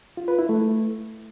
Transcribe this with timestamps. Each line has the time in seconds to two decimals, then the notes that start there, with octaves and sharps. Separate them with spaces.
0.17 F4
0.28 B4
0.39 E4
0.49 A3